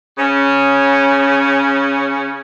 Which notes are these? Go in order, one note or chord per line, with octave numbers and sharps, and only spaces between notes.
C#3 C#4